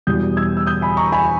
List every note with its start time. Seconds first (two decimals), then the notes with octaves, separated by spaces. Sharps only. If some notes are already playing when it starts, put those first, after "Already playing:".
0.07 E2 B2 G3 D#6 G6
0.37 E6 G#6
0.57 E6
0.66 D#6 G6
0.82 G#5 B5
0.97 A#5 C#6
1.12 G#5 B5